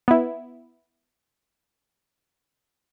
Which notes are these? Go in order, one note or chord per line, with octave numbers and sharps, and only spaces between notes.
B3 E4